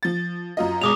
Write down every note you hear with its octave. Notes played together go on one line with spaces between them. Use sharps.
F3 A6
F#2 F4 D#5
B2 G#3 D6 D#6 F7